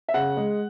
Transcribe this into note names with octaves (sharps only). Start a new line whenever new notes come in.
E5
C#3 F#5
G#3